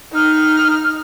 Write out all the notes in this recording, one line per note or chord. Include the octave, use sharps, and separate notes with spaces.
D#4 F6